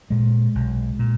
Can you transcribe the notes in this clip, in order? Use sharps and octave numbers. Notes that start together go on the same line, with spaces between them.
A#2 G#3
B1
A#2